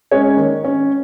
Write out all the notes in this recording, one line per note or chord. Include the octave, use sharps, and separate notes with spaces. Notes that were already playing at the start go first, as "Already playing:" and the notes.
G#3 C#4 C#5
D#3
C#4